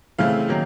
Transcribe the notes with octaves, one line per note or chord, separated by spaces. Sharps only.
C#3 E3 A3 C4 F5
D#3 F#3 A#3